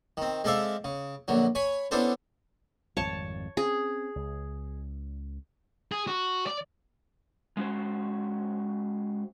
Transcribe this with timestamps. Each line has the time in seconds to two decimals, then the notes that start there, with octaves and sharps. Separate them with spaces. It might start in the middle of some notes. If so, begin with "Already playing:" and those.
0.17 D#3 C4
0.44 G#3 C4 A4 D5 E5 F5
0.84 C#3
1.28 A#1 D3 F#3
1.55 C#5 G#5 B5
1.91 B3 C#4 D4 E4 A4 C5
2.97 G#1 F2 G3 C#5 A5
3.57 C4 C#4 G#4
4.16 C#2
5.92 G#4
6.07 F#4
6.47 D5
7.57 G#3 C#4 F#4 C5